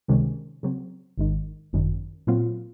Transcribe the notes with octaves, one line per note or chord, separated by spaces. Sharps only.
C#2 C3 D#3 G#3 C#4
C#3 F#3 C4
G#1 G#2 D#3
G#1 F#2 D#3
A#2 F#3 C4 F4